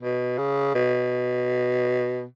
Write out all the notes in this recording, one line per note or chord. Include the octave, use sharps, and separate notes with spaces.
B2
C#3
B2